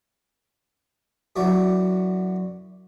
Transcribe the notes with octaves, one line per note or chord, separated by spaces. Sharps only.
F#2 E3 F#3 F#4 D5